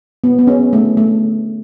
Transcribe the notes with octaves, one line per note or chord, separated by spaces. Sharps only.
B3
B3
C#4
A3
A3